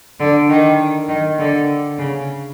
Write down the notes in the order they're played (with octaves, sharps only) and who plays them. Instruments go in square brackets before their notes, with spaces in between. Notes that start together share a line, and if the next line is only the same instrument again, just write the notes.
[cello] D3
D#3
D#3
D3
C#3